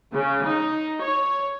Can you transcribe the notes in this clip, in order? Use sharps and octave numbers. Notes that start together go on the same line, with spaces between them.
C#3
D#4
C#5